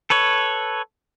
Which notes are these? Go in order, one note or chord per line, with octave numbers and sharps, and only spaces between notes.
A4 B4 C#5